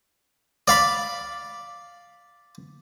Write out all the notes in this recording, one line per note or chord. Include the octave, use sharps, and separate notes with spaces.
D5 F5 B5